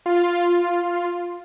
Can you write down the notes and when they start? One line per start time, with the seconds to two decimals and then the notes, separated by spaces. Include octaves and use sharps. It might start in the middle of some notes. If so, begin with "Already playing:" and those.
0.06 F4